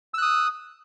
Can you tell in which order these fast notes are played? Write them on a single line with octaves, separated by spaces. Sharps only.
E6 F#6 D#6